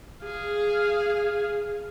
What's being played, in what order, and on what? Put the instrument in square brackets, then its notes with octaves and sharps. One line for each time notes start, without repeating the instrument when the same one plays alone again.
[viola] G#4 F5